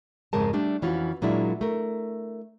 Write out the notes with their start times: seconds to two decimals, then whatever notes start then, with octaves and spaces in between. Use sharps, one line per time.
0.33 F2 G#2 C#3 G#3 A#4 A5
0.53 G3 A3 D4
0.82 F2 E3 C#4 F4 F#4
1.22 A#2 F#3 G#3 A#3 D4 E4
1.61 A3 A#4